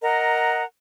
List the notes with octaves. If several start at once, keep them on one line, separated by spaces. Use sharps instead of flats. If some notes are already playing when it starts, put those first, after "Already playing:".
A#4 D#5 F#5 A#5